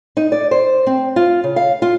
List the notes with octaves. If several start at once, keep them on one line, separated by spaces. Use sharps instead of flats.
D#4
D5
C5
C4
F4
C#3
F5
F4